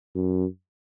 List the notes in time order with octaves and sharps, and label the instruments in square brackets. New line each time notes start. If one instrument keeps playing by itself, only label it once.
[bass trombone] F#2